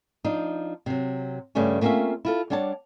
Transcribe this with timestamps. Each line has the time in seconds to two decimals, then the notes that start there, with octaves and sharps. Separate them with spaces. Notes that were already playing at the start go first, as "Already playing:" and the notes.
0.25 F3 D4 D#4
0.86 C3 F#3
1.55 G2 C#3 G3 A3 C#4
1.81 A3 A#3 C4 C#4 F4 E5
2.25 E4 F4 A4
2.50 G3 D4 C#5 F#5 A5